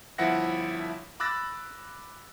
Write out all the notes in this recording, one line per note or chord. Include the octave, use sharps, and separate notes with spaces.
G1 F3 E4 E5 F#5 A#6
B5 D6 E6 F#6 A6 A#6